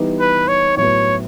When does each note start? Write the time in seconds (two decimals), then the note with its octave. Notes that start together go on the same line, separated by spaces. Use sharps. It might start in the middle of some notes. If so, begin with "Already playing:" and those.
Already playing: E3 G3 B3 D#4 G4
0.20 B4
0.48 C#5
0.77 A2 F#3 B3 C#5